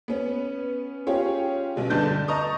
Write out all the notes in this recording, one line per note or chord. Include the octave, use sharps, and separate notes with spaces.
B3 C#4
C#4 F4 G4 G#4 C#5
B1 B2 G#3
G1 D3 D4 A5 G6
D#5 A5 A#5 C#6 D#6